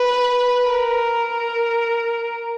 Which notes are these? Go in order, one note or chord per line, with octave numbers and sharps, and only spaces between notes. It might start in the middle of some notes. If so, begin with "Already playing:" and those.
Already playing: B4
A#4